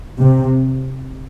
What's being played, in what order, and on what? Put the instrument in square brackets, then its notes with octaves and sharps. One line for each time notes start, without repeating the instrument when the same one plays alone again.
[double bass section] C3